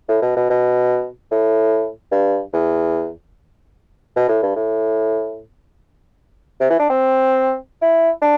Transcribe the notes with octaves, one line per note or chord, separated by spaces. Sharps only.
A2
B2
B2
B2
A2
G2
E2
B2
A2
G2
A2
C3
E3
D4
C4
E4
D4